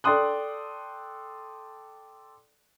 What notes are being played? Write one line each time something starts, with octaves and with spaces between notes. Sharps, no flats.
A4 D5 G5 C6 D#6 F#6